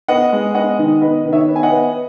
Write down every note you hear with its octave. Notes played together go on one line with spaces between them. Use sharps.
B3 D#5 F#5
G#3
B3 D#5 F#5
D#3
B3 B4 D#5
D#3
C#5 E5
B3
G#5
D#5 F#5
B3